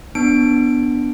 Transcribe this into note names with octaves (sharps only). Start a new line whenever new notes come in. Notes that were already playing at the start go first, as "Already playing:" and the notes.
B3 D4 D7